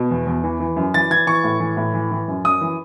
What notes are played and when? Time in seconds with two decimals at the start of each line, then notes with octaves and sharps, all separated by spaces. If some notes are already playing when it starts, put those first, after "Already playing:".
Already playing: B2
0.11 E2
0.27 E2
0.44 E3
0.60 E3
0.76 F#2
0.94 E3 A6
1.10 E3 G#6
1.27 E3 C#6
1.44 A2
1.60 E3
1.77 A2
1.94 E3
2.11 E3
2.28 F#2
2.44 F#2 D#6
2.61 E3